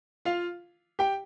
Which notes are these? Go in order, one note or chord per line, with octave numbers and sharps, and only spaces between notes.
F4 F5
G4 G5